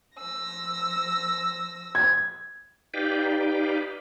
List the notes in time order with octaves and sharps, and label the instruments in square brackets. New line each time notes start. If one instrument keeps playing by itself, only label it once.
[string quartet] F3 E6 A#6
[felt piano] G#6
[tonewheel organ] D#4 G4 B4 D5 F5 G5